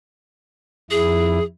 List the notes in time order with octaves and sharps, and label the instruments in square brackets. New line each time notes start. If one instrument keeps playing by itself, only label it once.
[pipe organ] F2 E4 [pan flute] G#4